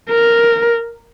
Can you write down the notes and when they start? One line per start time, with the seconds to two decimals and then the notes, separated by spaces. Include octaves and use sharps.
0.09 A#4